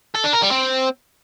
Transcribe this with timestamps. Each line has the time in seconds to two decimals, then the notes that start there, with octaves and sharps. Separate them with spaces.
0.15 A4
0.24 D4
0.33 A#4
0.42 G3
0.51 C4